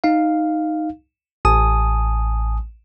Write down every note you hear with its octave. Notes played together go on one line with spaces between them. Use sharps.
D#4 F5
A1 G#5 A5 D#6